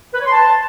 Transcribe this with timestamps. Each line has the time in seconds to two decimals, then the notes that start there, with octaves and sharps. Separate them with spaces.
0.13 B4
0.19 C#5
0.25 C6
0.32 A5